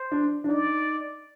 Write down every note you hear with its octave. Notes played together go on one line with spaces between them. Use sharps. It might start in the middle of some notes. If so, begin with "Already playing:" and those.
Already playing: C5
D4
D4
D#4 D5